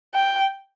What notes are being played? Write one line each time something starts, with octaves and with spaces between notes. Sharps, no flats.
G5